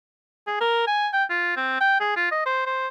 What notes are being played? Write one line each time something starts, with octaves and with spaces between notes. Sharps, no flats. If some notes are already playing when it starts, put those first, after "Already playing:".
G#4
A#4
G#5
G5
F4
C4
G5
G#4
F4
D#5
C5
C5